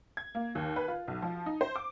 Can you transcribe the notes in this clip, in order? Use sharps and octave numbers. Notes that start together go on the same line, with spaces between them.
G#6
A#3
D#2
B4
F4
B1
F3
D#4
C5
D6